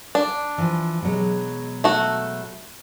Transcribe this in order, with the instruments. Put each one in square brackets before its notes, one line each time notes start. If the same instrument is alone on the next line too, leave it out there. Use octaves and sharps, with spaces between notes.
[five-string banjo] D4
[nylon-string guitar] E3 F3
B2 F#3 G#3
[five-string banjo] A3 F#4